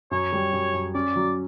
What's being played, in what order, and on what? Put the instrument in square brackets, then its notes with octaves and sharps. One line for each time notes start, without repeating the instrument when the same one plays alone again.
[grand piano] F#2 [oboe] C#5
[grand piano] G3
F#2
F#2
[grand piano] C#4 [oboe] D5
[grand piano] F#3